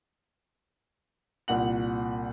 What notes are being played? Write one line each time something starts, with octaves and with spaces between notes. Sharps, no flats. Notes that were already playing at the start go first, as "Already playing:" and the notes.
C2 A#2 F#5 F#7